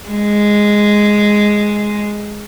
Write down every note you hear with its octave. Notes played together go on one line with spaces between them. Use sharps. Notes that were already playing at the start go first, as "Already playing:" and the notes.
G#3